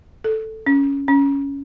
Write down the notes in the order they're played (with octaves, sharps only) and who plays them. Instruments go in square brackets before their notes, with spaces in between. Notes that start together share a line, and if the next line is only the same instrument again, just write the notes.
[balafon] A4
C#4
C#4